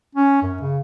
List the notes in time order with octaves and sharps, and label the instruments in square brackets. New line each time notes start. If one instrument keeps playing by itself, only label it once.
[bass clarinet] C#4
F#2
C#3